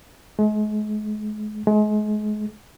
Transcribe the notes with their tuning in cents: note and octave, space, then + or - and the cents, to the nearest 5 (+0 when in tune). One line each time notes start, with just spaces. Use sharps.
G#3 +40
G#3 +35